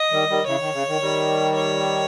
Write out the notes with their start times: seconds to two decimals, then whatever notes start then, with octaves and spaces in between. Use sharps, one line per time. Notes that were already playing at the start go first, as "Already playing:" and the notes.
Already playing: D#5
0.12 D#3 G3
0.30 D#3 G3
0.47 C#3 E3 C#5
0.61 D#3
0.74 C#3
0.88 D#3
1.01 D#3 G3
1.56 C#5